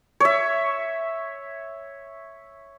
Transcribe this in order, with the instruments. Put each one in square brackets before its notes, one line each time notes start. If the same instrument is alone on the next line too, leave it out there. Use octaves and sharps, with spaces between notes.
[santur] C#5 E5